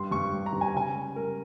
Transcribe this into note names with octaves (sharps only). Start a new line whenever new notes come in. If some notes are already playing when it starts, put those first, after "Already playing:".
Already playing: G2 G3 C6
G2 C#6
G3
A#5
G2
G#5
A#5
C#3 G#5
G3
G3 A#4